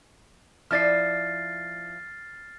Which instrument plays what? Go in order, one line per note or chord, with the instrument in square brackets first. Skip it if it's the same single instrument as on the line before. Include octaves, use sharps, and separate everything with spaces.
[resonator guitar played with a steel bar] F3 E4 D5 [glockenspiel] F6 A6 C7